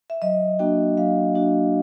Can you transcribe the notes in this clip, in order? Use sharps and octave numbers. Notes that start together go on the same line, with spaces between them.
E5
F#3 D#5
A#3 D4 F#4 G5
F#3 F5
A#3 D4 F#4